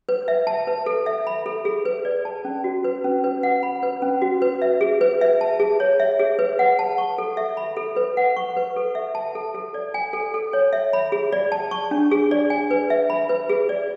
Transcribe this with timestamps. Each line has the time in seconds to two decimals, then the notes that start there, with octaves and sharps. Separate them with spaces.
0.09 B4
0.28 E5
0.47 A5
0.67 B4
0.86 A4
1.06 E5
1.27 B5
1.46 A4
1.65 G#4
1.85 B4
2.05 D5
2.25 A5
2.45 C#4
2.64 F#4
2.84 B4
3.04 C#4
3.24 B4
3.43 F#5
3.63 B5
3.83 B4
4.02 C#4
4.22 F#4
4.42 B4
4.62 E5
4.81 G#4
5.01 B4
5.21 E5
5.41 A5
5.60 G#4
5.80 C#5
6.00 E5
6.19 G#4
6.39 B4
6.59 F#5
6.79 A5
6.98 C#6
7.18 A4
7.37 E5
7.57 B5
7.77 A4
7.96 B4
8.17 F#5
8.37 C#6
8.57 B4
8.76 A4
8.95 E5
9.15 A5
9.35 A4
9.55 A4
9.74 D5
9.94 G#5
10.13 A4
10.34 A4
10.53 C#5
10.73 E5
10.93 B5
11.12 G#4
11.33 D5
11.52 A5
11.71 C#6
11.91 D4
12.11 G#4
12.31 D5
12.50 G#5
12.71 B4
12.90 E5
13.10 B5
13.29 B4
13.49 G#4
13.69 D5